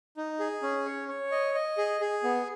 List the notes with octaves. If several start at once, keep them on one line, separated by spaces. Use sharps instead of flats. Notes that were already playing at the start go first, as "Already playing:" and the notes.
D#4
G#4
C#4
C#5
C#5
D#5
D#5
G#4
G#4
B3